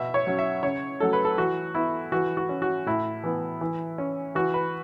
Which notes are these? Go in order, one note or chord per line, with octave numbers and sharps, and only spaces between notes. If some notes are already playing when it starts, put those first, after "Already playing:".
Already playing: B2 E5
C#5
F#3 C#4
E5
C#3 C#5
F#3 A3 C#4 A4
B4
A4
E3 F#4
B3 E4
E3 F#4
F#4
C#4
F#4
A2 E4
E3 B3
E3
C#4
E3 F#4
B4